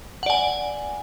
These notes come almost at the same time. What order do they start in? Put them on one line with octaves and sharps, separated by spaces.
F#5 D5 G#5